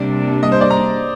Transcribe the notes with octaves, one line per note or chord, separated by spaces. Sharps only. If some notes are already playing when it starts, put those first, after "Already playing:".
Already playing: C3 G3 A#3 D4 D5
D#5
C5
D5
A#5